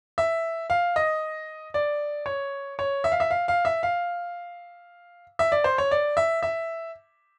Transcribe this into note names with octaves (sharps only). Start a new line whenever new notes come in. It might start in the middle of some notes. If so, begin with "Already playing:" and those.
E5
F5
D#5
D5
C#5
C#5
E5
F5
E5
F5
F5
E5
F5
E5
D5
C5
C#5
D5
E5
E5